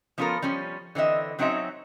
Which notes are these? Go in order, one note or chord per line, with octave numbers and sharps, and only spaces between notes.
F3 B3 C#4 F4 A4 A#4
F3 G3 C#4
D3 E3 C4 D#5 E5
F#3 C4 C#4 D#4 F#4 E5